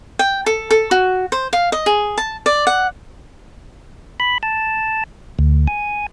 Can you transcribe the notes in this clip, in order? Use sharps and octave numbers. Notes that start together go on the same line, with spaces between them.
G5
A4
A4
F#4
C5
F5
D#5
G#4
A5
D5
F#5
B5
A5
D2
G#5